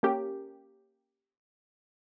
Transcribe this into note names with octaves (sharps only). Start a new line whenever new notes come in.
A#3 C#4 G4